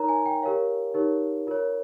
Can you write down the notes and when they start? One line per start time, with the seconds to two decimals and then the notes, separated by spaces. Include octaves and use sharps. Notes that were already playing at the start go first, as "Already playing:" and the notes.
Already playing: D#4 A#4 C#5 A#5
0.09 G#5
0.26 G5
0.43 G4 A#4 C#5 F5
0.94 D#4 G4 A#4 C#5
1.47 F4 A#4 C#5